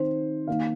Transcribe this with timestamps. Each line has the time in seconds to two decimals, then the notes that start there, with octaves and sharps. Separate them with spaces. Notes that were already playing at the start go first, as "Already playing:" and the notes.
Already playing: D#3 C4 D#4 C5
0.47 D#3 A#3 D#4 F5